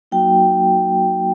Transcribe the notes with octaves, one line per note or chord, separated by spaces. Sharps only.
F#3 A#3 D#4 F#4 G5